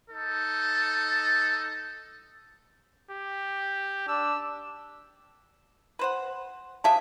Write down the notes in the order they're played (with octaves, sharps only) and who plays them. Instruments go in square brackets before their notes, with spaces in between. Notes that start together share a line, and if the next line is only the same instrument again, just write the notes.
[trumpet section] D#4 A4
[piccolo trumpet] G4
[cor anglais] D4 [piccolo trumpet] E6
[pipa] B4 C5 F#5
[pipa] G4 G#4 E5 [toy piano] C5 F5 A5